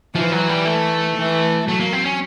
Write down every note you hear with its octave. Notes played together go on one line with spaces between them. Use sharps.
E3 F3
F#3
G3
A3
E3
F#3 A3
A#3
C4
C#4